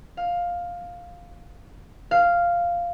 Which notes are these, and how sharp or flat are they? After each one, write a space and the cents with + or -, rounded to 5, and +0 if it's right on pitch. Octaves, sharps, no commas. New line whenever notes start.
F5 +10
F5 -5